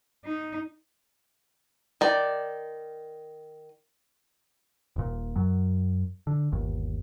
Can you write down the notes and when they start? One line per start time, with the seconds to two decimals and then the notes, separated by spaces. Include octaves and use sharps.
0.25 D#4
2.01 D#3 D5
4.96 D#1 A#2
5.36 F#2 F#3
6.27 D3
6.52 G1 D#2